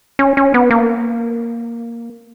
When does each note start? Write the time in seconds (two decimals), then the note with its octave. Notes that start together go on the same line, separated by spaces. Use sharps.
0.19 C#4
0.37 C#4
0.54 B3
0.71 A#3